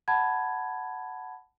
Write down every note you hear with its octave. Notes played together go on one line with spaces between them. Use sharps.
F#5 A5 B5 G#6